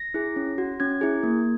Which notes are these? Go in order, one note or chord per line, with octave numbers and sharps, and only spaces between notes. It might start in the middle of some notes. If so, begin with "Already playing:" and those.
Already playing: A#6
E4 G#4
C#4
F#4
C#4 G#6
E4 G#4
A#3